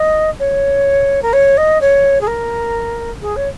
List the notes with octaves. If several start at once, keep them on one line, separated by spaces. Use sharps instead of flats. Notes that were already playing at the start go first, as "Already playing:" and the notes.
Already playing: D#5
C#5
A#4
C#5
D#5
C#5
G#4
A#4
G#4
C#5